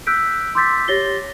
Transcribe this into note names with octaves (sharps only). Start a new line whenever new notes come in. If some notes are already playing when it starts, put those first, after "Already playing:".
E6 F#6 G6 B6 D7
C6 D6 E6 G6 A6 B6
G4 C#5 A6 A#6 C7 G7